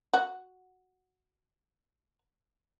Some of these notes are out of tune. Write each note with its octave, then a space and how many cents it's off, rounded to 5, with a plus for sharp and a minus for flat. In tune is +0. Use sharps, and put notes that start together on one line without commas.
F#4 -5